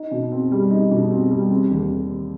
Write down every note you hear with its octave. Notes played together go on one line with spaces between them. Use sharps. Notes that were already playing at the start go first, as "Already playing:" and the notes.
Already playing: D#4
B2
C4
G3
D#4
B2
C4
G3
C4
D#2